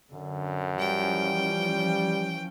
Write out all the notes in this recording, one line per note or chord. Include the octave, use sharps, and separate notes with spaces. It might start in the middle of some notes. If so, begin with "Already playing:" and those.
F#2 D3
E3 F3 G3 C#4 G5